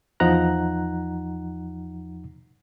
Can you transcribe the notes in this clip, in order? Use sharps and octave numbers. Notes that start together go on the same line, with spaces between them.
E2 F3 D#4 F#5 A#5 F#6